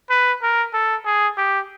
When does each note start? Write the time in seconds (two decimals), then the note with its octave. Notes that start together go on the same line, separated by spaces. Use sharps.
0.10 B4
0.43 A#4
0.74 A4
1.06 G#4
1.38 G4